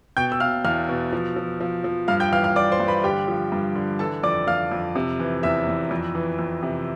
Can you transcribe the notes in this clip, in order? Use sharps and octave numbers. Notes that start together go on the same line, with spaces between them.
B2 G5 G6
E6
B2 F5 F6
E2 F5 F6
B2
F3
F3
F3
F3
G2 F5 F6
G5 G6
E3 F5 F6
F5 F6
E3 D5 D6
C5 C6
G2
B4 B5
D3 G4 G5
F3
G2
D3
E3 A4 A5
F2 D5 D6
F2 F5 F6
F2
C3
E3
E2 E5 E6
E2
F2
E3
F2
C3